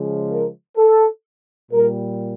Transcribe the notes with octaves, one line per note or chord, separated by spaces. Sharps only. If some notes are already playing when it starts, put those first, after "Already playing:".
Already playing: C#3 F3 G#3
A#4
A4
A#2 G3 A#4